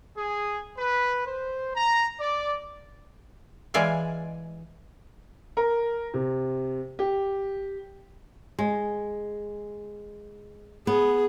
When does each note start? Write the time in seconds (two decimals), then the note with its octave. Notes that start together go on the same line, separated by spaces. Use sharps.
0.16 G#4
0.77 B4
1.26 C5
1.76 A#5
2.20 D5
3.74 E3 G#3 E4 D5 F5 G#5
5.57 A#4
6.14 C3
6.99 G4
8.59 G#3
10.87 B3 G#4